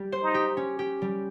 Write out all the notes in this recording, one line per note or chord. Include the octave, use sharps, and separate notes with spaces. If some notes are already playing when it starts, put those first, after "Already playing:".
Already playing: G3 G4
C5
D#4
G4
C#4
G4
G3